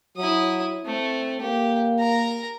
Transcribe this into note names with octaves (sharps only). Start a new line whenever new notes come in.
F#3 E4 D#6
A3 C4
A#3 G4
A#4 A#5